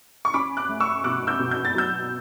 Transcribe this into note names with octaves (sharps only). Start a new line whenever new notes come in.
C#6
C#4 B5 D6
D6 F#6
A3
C#6 E6
B2 D6 F#6
E6 G6
B2
G6
A6
F#3 E6 G6